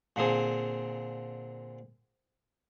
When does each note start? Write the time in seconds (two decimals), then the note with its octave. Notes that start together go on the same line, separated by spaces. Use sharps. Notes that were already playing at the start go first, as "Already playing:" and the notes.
0.16 A#2 D3 C4 G#4